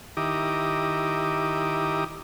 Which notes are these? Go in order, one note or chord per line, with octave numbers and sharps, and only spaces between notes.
D#3 E4 G4 A#5 D6 D#6